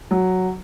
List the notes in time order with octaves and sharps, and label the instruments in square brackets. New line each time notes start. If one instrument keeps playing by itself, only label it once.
[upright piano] F#3